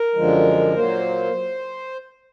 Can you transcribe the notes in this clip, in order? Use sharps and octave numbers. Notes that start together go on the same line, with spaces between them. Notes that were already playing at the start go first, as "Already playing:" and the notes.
Already playing: A#4
F#2 D3 F3 G#3
A#2 F#3 A#3 C5